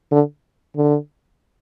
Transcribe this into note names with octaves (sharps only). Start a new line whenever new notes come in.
D3
D3